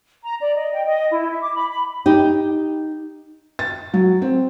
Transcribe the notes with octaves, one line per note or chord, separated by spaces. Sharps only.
A#5
D5
D#5
G5
D#5
E4
E5
D6
B5
B5
D#4 G4
A6
F#3
C4